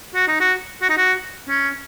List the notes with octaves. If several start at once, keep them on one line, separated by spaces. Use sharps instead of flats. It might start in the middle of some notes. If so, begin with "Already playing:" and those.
F#4
D#4
F#4
F#4
D#4
F#4
C#4